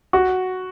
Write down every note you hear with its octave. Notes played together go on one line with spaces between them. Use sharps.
F#4